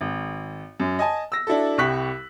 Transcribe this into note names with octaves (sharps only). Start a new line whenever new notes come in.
G#1
F#2
D#5 G#5 A5
E6 A#6
D4 E4 F#4 A4
C2 G3 G4 C#6 F#6 B6